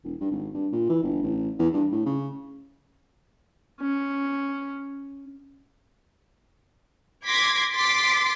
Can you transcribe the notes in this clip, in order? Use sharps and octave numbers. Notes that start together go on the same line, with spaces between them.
E1
G2
G#1
G2
A#2
E3
G1
A1
E2
G2
A2
C#3
C#4
C6 D6 G#6 A#6 B6
C6 D6 A6 B6 C7